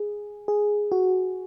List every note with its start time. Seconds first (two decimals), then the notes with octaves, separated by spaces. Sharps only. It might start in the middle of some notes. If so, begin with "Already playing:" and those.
Already playing: G#4
0.48 G#4
0.92 F#4